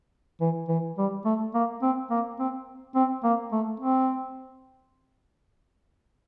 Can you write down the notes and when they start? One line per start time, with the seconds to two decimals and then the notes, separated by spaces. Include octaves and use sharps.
0.41 E3
0.69 E3
0.98 G3
1.25 A3
1.54 A#3
1.82 C4
2.10 A#3
2.39 C4
2.95 C4
3.24 A#3
3.52 A3
3.80 C4